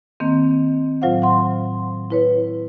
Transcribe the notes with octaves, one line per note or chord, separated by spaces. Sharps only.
D#3 A#3 C4
A2 F#3 F4 C5 F5 F#5
F#5 C6
E4 B4 C#5